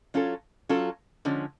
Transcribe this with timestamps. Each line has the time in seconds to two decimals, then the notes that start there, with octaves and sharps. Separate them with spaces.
0.14 F#3 C#4 F4 A4
0.69 F#3 C#4 F4 A4
1.25 D3 F3 G#3 C#4